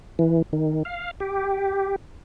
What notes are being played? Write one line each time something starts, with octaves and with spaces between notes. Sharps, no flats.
E3
D#3
F5
G4